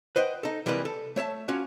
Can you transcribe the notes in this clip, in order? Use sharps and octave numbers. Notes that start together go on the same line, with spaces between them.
B4 C5 D#5 F#5 G5
D#4 A4
C3 E3 G3 G#3 A#3 B4
A4
A3 C#5 E5 A5
A#3 C#4 F4 F#4